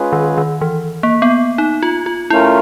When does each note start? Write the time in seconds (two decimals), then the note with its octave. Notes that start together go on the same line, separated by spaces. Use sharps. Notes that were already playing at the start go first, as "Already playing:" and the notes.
Already playing: G#3 C#4 F4 G#4 B4
0.13 D#3
0.37 D#3
0.61 E3
1.03 A#3
1.22 B3
1.58 D#4
1.83 F4
2.06 F4
2.30 A3 C#4 E4 F4 A#4